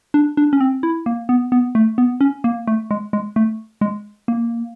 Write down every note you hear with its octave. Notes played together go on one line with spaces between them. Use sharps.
D4
D4
C#4
C4
E4
A#3
B3
B3
A3
B3
C#4
A#3
A3
G#3
G#3
A3
G#3
A#3